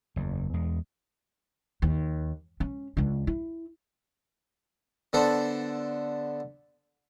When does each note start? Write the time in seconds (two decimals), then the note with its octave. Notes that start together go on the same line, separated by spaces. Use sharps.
0.16 F#1 E2
0.54 E2 G#3
1.82 D#2
2.60 C#4
2.97 C#2 D4
3.27 E4
5.13 D3 B3 A4 C5 D5